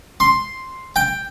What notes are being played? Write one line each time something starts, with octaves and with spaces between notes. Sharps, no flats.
C6
G5